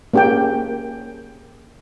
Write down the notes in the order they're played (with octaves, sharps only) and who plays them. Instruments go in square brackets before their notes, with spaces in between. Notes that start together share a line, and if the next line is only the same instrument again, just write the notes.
[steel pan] A#3 C#4 G4 G#4 G5